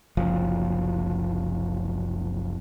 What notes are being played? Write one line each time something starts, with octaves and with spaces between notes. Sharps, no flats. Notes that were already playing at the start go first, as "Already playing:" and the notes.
F#1 C2 F3